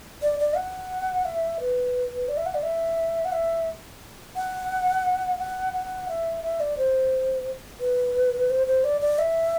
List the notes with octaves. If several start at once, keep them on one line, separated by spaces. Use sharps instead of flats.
D5
D5
F#5
E5
B4
D5
E5
F#5
D5
E5
F#5
E5
F#5
F#5
F#5
E5
E5
D5
C5
B4
C5
C5
D5
D5
E5